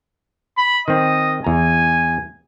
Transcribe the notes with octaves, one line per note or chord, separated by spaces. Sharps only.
B5
D#3 C4 D#5
E2 G#5 A#5